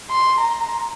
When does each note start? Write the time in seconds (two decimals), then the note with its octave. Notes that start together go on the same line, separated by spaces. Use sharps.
0.10 C6
0.40 A#5